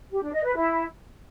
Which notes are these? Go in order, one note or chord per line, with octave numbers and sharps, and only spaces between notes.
G4
D4
D#5
B4
E4